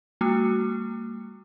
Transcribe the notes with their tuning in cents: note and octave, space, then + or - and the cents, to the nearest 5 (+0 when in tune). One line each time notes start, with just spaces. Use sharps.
G3 +25 A#3 -30 F#4 +0